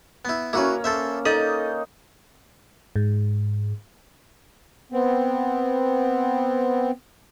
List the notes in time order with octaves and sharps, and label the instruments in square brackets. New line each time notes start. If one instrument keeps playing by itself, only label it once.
[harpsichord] B3 E4
[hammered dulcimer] A#3 C#4 [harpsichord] E4 F#4 B4
[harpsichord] A4 C5 E5
[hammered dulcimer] D#4 [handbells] A4 A6 [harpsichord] D#5
[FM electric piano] G#2
[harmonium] B3 C4